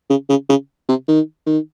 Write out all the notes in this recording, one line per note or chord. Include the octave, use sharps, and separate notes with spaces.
C#3
C#3
C#3
C3
D#3
D#3